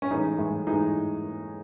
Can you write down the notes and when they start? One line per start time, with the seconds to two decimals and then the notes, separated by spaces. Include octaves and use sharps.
0.02 C#4
0.10 A2 E3 G#3 D#4
0.38 A2 E3 G#3
0.67 A2 E3 G#3 D#4